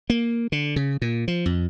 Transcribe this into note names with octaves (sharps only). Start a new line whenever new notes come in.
A#3
D3
C#3
A#2
F3
F2